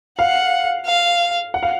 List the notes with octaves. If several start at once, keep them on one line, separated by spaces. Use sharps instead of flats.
F5 F#5
F5
F#5
F5